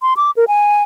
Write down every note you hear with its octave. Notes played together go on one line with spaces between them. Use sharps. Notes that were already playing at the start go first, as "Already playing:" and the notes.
C6
D6
A#4
G#5